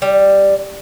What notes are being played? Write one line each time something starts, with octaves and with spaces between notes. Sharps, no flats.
G3